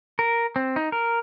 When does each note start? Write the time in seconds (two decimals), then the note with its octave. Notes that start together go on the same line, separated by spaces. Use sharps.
0.19 A#4
0.56 C4
0.76 D#4
0.92 A#4